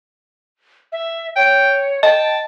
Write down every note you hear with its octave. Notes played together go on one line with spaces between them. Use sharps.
E5
C#5 G5
D#5 G5 A5